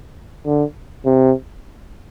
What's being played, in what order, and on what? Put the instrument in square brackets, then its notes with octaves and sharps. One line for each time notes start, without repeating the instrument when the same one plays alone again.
[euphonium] D3
C3